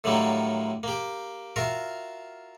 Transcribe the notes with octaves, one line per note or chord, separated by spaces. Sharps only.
A2 D3 D#3 F#3 G3 A#3
A#3 G4
F4 F#4 A#4 E5